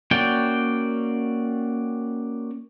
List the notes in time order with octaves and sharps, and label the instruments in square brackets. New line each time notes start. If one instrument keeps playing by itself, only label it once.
[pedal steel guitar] A#3 C#4 F#4 D5 G5